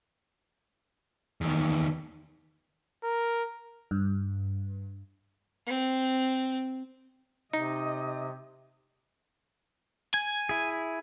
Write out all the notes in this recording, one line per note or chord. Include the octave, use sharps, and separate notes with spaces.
E2 D#3
A#4
G2
C4
C3 D#4 D#5
G#5 G#6
E4 G#4